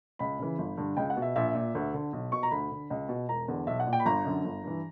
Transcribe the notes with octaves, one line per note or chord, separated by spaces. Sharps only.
C#2 B5
C#3 E3
G1
G2 D3
C#2 G5
F#5
B2
E5
A#1 E5
A#2
D2
D3
B1
B2 C#6
A#5
D2 B5
D3
C#2
B2
E1 A#5
E2 D3
B1 E5
F#5
A#2
G5
B5
G1 A#5
F#2 D3
G1
G2 E3